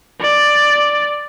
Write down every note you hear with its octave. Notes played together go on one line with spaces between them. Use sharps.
D5